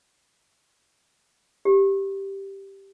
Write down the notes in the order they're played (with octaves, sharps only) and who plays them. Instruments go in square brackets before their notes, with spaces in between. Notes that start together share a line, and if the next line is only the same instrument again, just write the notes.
[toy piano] G4